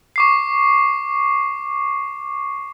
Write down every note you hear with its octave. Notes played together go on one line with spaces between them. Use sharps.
C#6 D6 C7